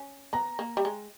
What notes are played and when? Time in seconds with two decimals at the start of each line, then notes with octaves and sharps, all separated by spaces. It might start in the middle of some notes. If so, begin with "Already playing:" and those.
Already playing: C#4
0.33 B3 A#5
0.59 A#3
0.77 G3
0.85 G#3